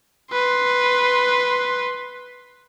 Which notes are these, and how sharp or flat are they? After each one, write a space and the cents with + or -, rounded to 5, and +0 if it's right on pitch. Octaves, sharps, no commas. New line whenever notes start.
B4 +0 C6 +5